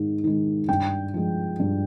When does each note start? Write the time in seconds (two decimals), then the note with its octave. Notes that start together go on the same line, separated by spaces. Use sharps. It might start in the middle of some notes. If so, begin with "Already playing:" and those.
Already playing: G#2 D#3 G#3
0.24 D#3 G#3
0.69 G2 G5
1.14 F3 G#3
1.60 G2